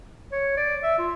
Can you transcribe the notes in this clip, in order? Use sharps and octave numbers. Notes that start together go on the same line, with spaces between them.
C#5
D5
E5
F4